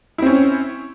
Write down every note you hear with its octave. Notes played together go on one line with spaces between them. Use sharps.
C4 C#4 E4